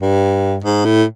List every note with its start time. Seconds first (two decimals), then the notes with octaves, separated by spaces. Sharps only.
0.01 G2
0.64 G#2
0.85 A2